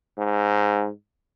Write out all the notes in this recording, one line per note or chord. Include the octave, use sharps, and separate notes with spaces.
G#2